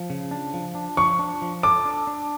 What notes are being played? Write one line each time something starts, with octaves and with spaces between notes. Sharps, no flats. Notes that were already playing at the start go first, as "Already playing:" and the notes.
Already playing: F3
C#3
D4
F3
D4
F3 C#6
D4
F3
A4 D6
D4
D4